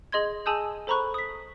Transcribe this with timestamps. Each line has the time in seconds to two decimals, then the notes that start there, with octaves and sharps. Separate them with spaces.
0.12 G#4 D#5 C6 G#6
0.46 G#4 G#5 A5 D#6 E6 G6
0.87 A4 C5 A#5 B5 C#6 F#6
1.14 D#6 B6